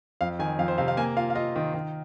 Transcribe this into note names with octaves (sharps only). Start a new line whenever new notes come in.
F2 F5
D#3 G#5
F2 F5
C5
C3 F5
F5
A#3 G#5
F4 F5
F5
F4 D#5
D#3
D#3